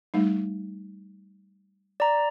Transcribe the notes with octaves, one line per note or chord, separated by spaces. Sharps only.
G3 A3 D#4
D5 A#5